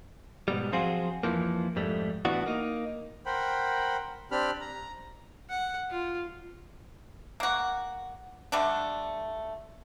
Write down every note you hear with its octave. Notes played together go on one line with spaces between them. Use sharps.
G#2 B2 G3
F3 F#3 C4 F4 F#4 G#4
F2 E3 F3 A#3
F2 G#2 G3 A3
A2 E3 B3 D4 F#4
A#3 D#4
A#4 C5 F#5 G5 B5
C4 D4 G4 B5 F6
A#5
F#5
F4
A#3 F#4
D3 G3 A3 D4